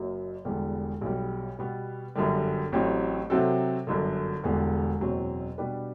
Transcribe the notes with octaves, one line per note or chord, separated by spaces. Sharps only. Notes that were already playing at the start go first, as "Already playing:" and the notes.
Already playing: F#1 F#2 F#3
E1 E2 D3 G3 B3
B1 B2 G3
B2 G3 B3
G1 F#2 D3 G3
A1 A2 F#3 C4 G4
C3 F#3 C4 F#4 A4
G1 F#2 D3
E1 E2 D3 G3 B3
F#1 E2 B2 F#3 C4
B2 G3 D4 G4 B4